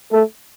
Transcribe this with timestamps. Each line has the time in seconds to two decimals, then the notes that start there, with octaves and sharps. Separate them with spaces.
0.13 A3 A4